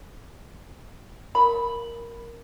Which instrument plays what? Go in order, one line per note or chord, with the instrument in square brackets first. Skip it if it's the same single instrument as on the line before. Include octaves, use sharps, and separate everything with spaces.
[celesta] A#4 [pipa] B5